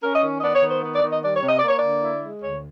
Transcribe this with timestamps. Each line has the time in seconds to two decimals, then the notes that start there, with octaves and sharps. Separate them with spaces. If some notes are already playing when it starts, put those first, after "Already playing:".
0.02 C#4 A#4
0.15 D#5
0.22 D#3
0.38 D#5
0.42 B3 D5
0.55 C#5
0.62 D#3
0.69 C5
0.82 B3
0.95 D5
1.02 D#3
1.09 D#5
1.22 G3 D5
1.35 C#5
1.43 C3
1.48 D#5
1.58 A#3 D5
1.68 C#5
1.77 D3 D5
2.02 E4
2.22 G#3
2.42 D2 C#5